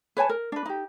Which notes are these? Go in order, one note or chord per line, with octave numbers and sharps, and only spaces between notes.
B4 C#5 G#5 A5
A#4
D4 B4
D#4 G4